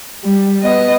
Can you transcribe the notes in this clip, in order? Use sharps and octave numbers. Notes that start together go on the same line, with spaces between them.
G3
B3 D#5